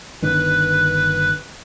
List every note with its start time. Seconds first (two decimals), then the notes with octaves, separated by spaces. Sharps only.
0.22 G1 D#3 D4 B4